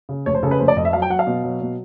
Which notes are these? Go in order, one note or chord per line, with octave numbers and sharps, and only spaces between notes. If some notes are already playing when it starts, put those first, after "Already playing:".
C#3
F1 C#5
C5
C#3 A4
B4
F1 C5
D5
F2 D#5
E5
F#3 F5
G5
F#3 F#5
F5
B2
F#3
B2